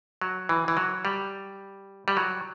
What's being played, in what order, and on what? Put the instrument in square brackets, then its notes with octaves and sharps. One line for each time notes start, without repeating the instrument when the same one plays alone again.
[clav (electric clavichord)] F#3
E3
E3
F#3
G3
G3
F#3